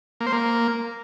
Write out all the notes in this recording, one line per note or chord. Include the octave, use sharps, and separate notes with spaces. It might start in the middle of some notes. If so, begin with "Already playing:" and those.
A#3
C5
A#3